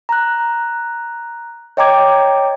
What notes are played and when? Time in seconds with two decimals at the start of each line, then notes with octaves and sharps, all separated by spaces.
0.09 A#5 F#6
1.77 C#5 D#5 G5 A#5 D6 G#6